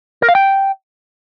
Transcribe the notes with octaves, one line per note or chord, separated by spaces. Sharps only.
A#4
F5
G5